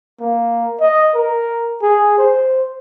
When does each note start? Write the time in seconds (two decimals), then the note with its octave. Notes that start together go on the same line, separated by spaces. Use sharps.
0.20 A#3
0.80 D#5
1.15 A#4
1.82 G#4
2.18 C5